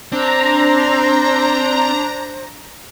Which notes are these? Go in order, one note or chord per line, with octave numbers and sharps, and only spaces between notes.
C4 D4 C5 A#5